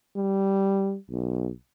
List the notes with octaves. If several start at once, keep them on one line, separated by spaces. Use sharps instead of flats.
G3
B1